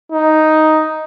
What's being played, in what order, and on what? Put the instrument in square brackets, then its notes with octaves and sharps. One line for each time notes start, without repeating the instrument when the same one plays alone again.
[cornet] D#4